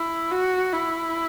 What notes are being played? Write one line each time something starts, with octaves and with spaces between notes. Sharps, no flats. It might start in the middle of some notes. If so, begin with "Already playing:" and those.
Already playing: E4
F#4
E4